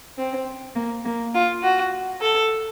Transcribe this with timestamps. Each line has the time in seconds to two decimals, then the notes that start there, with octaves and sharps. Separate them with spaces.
0.18 C4
0.75 A#3
1.05 A#3
1.34 F4
1.62 F#4
2.21 A4